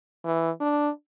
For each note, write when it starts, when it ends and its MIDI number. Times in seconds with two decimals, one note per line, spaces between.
0.25 0.50 52
0.60 0.90 62